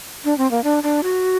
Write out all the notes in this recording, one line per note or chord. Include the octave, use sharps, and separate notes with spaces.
D4
C4
A#3
D4
D4
F#4